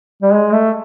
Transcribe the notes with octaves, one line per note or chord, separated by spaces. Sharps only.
G3
G#3
A3